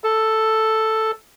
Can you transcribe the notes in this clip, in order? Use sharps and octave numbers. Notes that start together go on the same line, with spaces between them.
A4